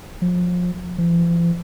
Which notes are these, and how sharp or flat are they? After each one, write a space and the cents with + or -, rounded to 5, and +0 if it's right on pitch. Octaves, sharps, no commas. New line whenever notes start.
F3 +30
F3 -45